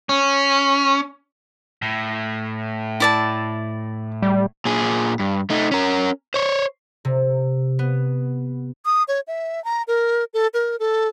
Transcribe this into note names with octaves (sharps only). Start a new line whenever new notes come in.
C#4
A2
E4 D5 A5
G3
A#2 G#4
G2
A3 D#4
C#4 A#4
C5 C#5
C3
B3
D#6
C#5
E5
A#5
A#4
A4
A#4
A4